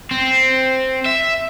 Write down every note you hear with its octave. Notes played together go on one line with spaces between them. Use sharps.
C4
E5